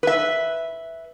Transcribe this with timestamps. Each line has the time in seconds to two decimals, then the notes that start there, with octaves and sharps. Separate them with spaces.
0.03 B4 E5